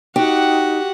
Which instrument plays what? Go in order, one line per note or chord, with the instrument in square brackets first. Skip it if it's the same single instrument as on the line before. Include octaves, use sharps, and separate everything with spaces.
[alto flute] D#4 [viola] F#4 F#5 [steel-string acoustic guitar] G4